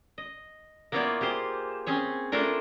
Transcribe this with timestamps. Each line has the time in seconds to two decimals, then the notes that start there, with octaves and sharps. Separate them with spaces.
0.18 D#5
0.92 A#3 B3 E4 F4 C#5 D5
1.21 F4 G4 G#4 C5
1.87 C4 C#4 G#4 C#5
2.32 A3 D4 E4 F4 A#4